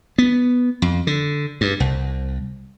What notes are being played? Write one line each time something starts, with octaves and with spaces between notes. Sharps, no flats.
B3
F2
D3
G2
C2